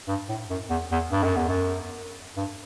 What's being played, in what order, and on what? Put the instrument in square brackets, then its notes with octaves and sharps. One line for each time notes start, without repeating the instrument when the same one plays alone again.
[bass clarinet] G2
A2
F#2
E2
E2
G2
F#2
E2
F#2
G2